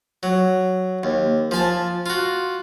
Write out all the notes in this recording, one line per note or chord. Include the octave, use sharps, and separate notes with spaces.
F#3
D#2
F3 G#5 A5
F4 F#4